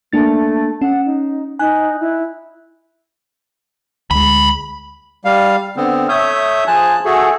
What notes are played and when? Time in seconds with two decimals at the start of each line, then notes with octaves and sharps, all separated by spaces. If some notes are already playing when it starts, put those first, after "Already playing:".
0.13 A3 A#3 D4 A6
0.82 C#4 F#5
1.06 D#4
1.59 D#4 G#5 F#6
2.00 E4
4.11 D2 G#3 B5
5.25 G3 F5
5.77 D3 B3 C4
6.09 A3 C#5 E5 D#6 G6
6.67 F3 G#4 C5 G#5 A5 F#6
7.05 A3 F#4 G#4 A4 E5 G#5